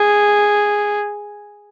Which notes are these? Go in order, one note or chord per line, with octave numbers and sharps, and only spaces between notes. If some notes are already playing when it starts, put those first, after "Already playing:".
Already playing: G#4